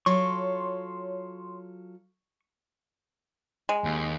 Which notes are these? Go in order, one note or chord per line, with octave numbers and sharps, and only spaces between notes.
F#3 F4 A4 C#5 C6 C#6
G#3
D#2